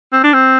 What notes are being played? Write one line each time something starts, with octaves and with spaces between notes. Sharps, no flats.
C4
D4
C4